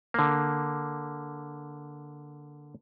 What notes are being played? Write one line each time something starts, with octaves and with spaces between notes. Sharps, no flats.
D3 A#3